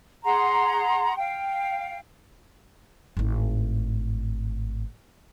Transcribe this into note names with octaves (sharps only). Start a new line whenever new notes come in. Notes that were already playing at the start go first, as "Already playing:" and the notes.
G#4 F#5 A#5 C6
F5 G5
G#1 A2